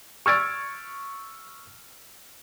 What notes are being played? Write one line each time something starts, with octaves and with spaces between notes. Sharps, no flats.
C#6 E6 F6 G#6 A6 D7